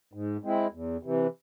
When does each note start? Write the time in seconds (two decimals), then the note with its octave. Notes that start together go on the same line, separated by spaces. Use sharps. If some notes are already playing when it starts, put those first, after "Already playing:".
0.13 G#2
0.43 G#3 C4 E4
0.73 E2
1.03 C3 E3